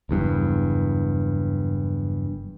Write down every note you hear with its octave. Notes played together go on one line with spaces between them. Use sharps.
F#1 E2 G2